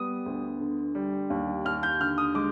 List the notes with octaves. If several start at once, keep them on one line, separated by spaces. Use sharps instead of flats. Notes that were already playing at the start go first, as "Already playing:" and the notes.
Already playing: G3 B3 D#6
D2
D3
G3
D#2
D#2 F6
G6
D3 F6
D#6
G#3 D6